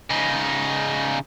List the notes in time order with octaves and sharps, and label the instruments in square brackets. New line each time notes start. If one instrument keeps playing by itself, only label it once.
[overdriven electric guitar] C#3 D#4